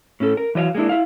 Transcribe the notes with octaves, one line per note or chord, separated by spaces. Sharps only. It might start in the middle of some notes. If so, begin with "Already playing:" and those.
A2 C#4 A4
A#4
E3 F#3 D#5 F5
G#3 A#3 D4 E4
E4 F5